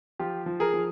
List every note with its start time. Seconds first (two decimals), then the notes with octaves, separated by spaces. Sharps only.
0.19 F3 F4 G4
0.46 F3
0.60 G#4 A#4
0.74 F3